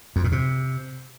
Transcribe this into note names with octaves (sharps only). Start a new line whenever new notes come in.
F2
A#2
C3